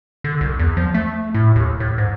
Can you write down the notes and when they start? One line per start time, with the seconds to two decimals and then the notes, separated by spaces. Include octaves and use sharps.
0.24 D3
0.41 C2
0.59 E2
0.77 F3
0.94 A3
1.34 A2
1.56 D#2
1.80 A2
1.98 G#2